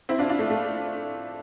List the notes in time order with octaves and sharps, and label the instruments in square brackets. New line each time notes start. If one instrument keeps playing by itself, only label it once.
[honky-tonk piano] C4 E4
D4 F4
D4 F4
A3
A3